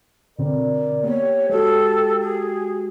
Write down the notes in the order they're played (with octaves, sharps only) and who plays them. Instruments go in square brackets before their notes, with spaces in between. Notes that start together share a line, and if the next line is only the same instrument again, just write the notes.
[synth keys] B2 D3 C4 [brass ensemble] A#4 D5
[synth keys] A#3 B3 [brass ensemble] G4 [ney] C#5
[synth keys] G#3 F#4 [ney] A4
[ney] G#4